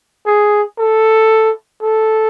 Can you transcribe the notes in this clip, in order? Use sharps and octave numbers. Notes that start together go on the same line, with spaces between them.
G#4
A4
A4